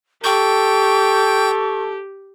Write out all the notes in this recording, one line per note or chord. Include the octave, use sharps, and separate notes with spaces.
G4 A4 G5 C#6 G6